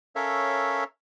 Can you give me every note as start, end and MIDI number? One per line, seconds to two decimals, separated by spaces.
0.16 0.84 61
0.16 0.84 69
0.16 0.84 70
0.16 0.84 73
0.16 0.84 76
0.16 0.84 77